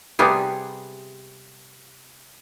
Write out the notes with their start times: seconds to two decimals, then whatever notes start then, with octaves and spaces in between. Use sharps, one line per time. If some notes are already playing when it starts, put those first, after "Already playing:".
0.19 C3 G3 B3 G#4